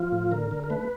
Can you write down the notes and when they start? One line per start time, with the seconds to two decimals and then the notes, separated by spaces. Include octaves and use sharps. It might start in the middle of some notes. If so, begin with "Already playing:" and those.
Already playing: F3 F4
0.12 A2
0.31 D3 A#4
0.51 D3
0.64 A#4
0.70 A3 B4